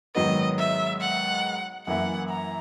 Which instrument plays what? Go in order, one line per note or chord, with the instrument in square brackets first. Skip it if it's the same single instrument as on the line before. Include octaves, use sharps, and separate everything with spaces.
[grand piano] G#2 D#3 F#3 B3 [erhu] D#5
[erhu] E5
F#5
[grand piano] F#2 E3 A#3 E4 [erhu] F#5
[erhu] A#5